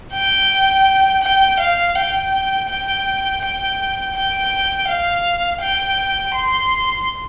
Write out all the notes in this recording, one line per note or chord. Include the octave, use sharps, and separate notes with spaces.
G5
G5
F5
G5
G5
G5
G5
F5
G5
C6